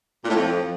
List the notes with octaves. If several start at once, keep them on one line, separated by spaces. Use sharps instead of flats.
A#2
A2
F2